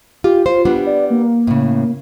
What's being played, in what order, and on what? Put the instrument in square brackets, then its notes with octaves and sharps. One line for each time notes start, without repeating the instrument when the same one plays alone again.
[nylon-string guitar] F4 [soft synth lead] G4
[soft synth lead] F4 [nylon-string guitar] C5
[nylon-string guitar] G3 B3 D4
[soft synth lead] D5
A#3
[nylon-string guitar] A2 C#3